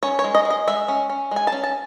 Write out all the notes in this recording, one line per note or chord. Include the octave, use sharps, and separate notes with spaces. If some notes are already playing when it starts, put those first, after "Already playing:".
C#4 C#5
C#5
G#3
D#5
G#3
D#5
G#3 E5
C#4
C#4
G#3 G#5
A5
C#4
A5